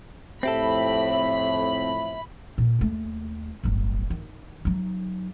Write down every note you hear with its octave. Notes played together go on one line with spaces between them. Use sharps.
F2 A2 C4 G4 A4 E5 B5
A#2
D#2 A3
D1 G1
D#3
F#3 D#4